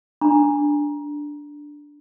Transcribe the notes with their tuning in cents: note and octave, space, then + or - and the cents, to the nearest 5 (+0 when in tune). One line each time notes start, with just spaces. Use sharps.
D4 +0 A#5 +15